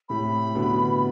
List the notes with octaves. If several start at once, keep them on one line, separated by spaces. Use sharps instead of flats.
A2 C3 B5
B2 D3